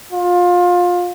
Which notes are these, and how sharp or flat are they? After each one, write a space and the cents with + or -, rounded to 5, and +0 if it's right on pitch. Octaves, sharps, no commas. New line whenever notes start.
F4 +25